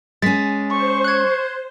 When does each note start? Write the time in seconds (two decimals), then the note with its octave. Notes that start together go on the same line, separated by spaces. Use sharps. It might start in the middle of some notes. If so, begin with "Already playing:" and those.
0.22 G#3 C#4 A6 B6
0.70 C5 C#6
1.04 F#6 G#6